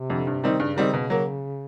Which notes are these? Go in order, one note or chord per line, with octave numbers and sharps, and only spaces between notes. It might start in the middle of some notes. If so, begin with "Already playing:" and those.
Already playing: C3
F2 D3
G2
D#3 G3 C4 D#4
C3
G2 C#3
D#3 G3 C4 D#4
B2
F#3 A#3